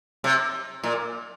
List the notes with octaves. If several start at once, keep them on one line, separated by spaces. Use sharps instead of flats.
C3
A#2